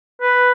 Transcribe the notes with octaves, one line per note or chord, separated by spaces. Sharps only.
B4